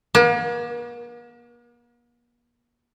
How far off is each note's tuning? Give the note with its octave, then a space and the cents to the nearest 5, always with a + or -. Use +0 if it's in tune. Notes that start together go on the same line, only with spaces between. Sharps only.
A#3 +45